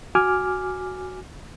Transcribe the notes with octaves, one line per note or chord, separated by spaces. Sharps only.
F#4 G#5 D6 F6